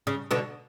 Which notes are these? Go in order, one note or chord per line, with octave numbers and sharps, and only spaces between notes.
C#3
B2 D3